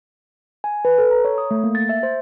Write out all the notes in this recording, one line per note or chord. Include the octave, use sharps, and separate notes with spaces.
G#5
B4
A4
A#5
C#5
D#6
A3
A#3
A6
E5
C5